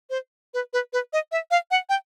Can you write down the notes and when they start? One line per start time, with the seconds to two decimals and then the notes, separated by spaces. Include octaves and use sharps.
0.10 C5
0.54 B4
0.73 B4
0.93 B4
1.13 D#5
1.32 E5
1.51 F5
1.71 F#5
1.89 G5